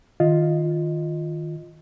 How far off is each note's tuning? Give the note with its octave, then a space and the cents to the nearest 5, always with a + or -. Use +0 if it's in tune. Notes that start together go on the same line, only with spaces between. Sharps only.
D#3 +0 F4 +0 D#5 +0